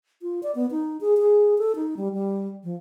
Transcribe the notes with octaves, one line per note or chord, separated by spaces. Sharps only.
F4
D5
B3
D#4
G#4
G#4
A4
D#4
G3
G3
F3